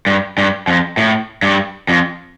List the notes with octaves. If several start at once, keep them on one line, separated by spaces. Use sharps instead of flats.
G2
G2
F2
A2
G2
F2